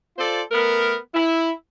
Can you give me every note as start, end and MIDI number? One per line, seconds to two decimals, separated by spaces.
0.18 0.42 65
0.18 0.42 69
0.18 0.42 72
0.18 0.42 74
0.51 0.97 57
0.51 0.97 59
0.51 0.97 70
1.14 1.51 64